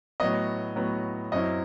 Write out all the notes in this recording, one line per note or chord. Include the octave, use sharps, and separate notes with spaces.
A2 F#3 B3 D#5
A2 F#3 B3
F#2 F#3 C4 E4 D#5